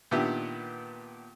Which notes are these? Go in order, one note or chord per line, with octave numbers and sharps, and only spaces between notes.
A#2 D#3 B3 D4 G4 E5